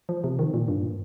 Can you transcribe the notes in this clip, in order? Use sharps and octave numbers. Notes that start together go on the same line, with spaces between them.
F3
C3
D#3
A#2
G2